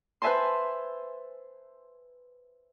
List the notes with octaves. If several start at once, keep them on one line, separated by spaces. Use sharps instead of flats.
B4 C5 E5 G#5 A5 C6